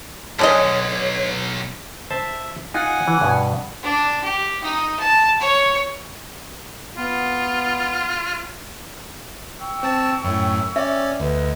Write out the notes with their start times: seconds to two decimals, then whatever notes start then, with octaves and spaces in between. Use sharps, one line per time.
0.39 B1 G#2 D3 G#4 C#5 D#5
2.10 C5 E5 A5
2.74 D#4 F4 F#5 G#5
3.08 E3
3.21 G2 B2
3.83 D4
4.24 G4
4.63 D#4
4.99 A5
5.41 C#5
6.97 B3 F4
9.59 G5 C#6 E6
9.83 C4 A5
10.24 F#2 A2
10.76 C#4 D5 E5
11.20 D2 B4 D#5